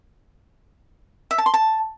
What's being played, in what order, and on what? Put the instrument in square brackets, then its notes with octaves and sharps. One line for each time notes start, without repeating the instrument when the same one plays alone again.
[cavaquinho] E5
A5
C6
A5